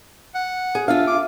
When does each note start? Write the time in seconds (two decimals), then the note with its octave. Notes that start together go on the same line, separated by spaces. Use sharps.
0.35 F#5
0.75 G#4
0.88 D4 F4 E5 F5
1.08 D6